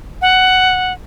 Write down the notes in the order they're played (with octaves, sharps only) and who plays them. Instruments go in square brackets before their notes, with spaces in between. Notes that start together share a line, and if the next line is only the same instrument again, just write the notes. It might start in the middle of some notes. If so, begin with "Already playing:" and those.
[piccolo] F#5